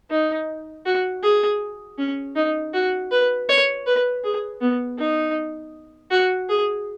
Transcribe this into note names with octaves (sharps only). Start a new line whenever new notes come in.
D#4
F#4
G#4
C#4
D#4
F#4
B4
C#5
B4
G#4
B3
D#4
F#4
G#4